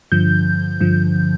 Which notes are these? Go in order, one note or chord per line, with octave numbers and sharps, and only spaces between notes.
G2 D3 F3 G6
G2 D3 F3